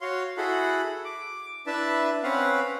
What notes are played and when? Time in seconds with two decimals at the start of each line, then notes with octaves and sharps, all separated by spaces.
0.01 F#4 C#5 F5 C6
0.37 E4 F#4 G#4 A4 F#5 B5
1.05 D6
1.67 D4 E4 B4 E5 A5
2.23 C4 C#4 B4 F5 F#5